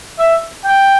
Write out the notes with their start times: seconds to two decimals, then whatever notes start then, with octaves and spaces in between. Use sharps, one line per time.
0.19 E5
0.64 G5